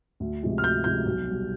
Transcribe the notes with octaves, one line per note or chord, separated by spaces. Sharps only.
D2
C3 F3 G#3
F6
D2 G6
C3 F3 G#3 G6
B1
B2 G3